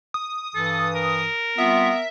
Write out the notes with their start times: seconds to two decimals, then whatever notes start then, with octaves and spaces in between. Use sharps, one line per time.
0.14 D#6
0.55 G2 E3 A4
0.95 A#4
1.58 G3 B3 C4 F4 E5